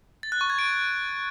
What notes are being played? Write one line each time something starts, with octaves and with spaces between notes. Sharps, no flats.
A6
F#6
C#6
G#6
D7